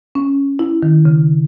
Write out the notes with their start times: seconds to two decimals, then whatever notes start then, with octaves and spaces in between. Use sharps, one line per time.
0.15 C#4
0.59 E4
0.83 D#3
1.05 C#3